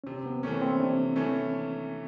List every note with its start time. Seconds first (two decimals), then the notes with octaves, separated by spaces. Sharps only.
0.04 C#4
0.07 C3 C4
0.26 B3
0.43 E3 A3 A#3 C#4
0.62 C4
0.79 C3 D4
1.16 E3 A3 C#4